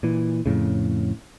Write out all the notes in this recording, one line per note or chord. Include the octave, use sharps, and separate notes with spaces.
A#2 E3
F2 A2 C#3